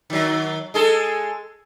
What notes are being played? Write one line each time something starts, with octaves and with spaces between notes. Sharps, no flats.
D#3 F#3
G#3 G#4 A4